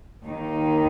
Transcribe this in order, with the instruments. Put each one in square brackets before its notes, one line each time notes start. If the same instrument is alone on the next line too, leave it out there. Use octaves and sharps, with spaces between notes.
[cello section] D#2 D#3 A#3 D#4